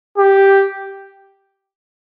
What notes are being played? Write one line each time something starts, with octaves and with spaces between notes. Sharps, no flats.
G4